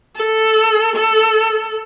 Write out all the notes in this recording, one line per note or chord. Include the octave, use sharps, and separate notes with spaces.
A4
A4